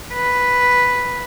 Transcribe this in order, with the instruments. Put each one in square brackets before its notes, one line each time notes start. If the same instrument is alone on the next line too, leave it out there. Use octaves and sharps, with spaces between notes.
[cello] B4